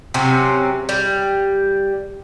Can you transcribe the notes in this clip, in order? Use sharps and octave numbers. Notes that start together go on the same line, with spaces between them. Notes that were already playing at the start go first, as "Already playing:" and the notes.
C3 F#3 C4 C#4
G3